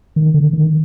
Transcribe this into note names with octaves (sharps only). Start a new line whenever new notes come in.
D#3
D3
D#3